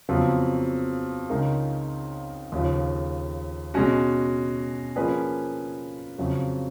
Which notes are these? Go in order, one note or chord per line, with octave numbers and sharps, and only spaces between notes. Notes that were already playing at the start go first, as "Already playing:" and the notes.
F2 C#3 F#3 B3 F4
C#2 C#3 G#3 D#4 A#4
D#2 C#3 F3
B2 G#3 C#4 F#4
F3 A#3 C#4 G#4 B4
F2 C#3 F#3